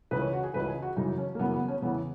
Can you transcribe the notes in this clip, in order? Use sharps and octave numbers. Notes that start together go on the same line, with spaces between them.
C#2 C#3 E3 B4
C#5
F#4
G#4
C#2 C#3 E3 B4
G#4
F#4
F#2 C#3 E3 D#4
C#4
A#3
F#2 C#3 E3 B3
B3
C#4
E2 C#3 E3 B3